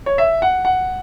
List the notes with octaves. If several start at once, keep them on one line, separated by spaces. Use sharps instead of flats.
C#5
E5
F#5
F#5